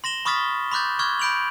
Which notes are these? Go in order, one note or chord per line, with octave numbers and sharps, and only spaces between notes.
C6 A#6 E7 G7
B5 C#6 D#6 F6 A6 B6
B5 C6 D6 F#6 G6 A6
C#6 D6 F6 F#6 G#6
B5 G6 D7 F7 F#7